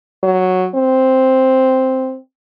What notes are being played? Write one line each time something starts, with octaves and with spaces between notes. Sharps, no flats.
F#3
C4